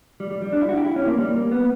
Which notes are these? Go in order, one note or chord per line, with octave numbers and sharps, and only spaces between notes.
G3
G3
G3
D4
E4
F#4
G4
E4
C#4
A#3
G3
A#3
B3